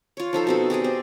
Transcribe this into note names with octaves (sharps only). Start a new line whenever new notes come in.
F4 C#5
F3 D#4 A4 C5
B2 C4 A4
G4 G#4 D5 D#5
C4